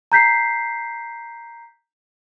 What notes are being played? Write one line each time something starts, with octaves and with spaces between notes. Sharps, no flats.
A#5 G6 B6 C7